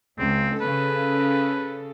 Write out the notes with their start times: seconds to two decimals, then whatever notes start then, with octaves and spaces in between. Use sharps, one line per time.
0.19 C#2 C4
0.61 C#3 A4 B4